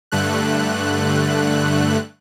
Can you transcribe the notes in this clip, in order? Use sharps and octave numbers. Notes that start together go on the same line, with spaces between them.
G2 D3 A3 F#6